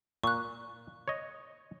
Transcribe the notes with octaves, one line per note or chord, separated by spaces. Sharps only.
A#2 C#6 F#6
C#5 D#5